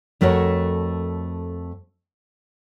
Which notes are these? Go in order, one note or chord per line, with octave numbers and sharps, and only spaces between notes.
F2 A3 F#4 A#4 C#5